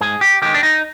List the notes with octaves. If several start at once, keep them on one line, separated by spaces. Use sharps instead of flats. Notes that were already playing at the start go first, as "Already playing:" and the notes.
G#2 G#4
G4
D#3 G#3 G4
D4
D#4